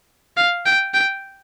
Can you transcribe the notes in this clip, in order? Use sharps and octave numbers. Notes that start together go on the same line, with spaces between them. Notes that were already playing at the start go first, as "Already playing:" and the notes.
F5
G5
G5